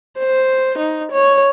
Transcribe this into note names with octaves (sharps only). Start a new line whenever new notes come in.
C5
D#4
C#5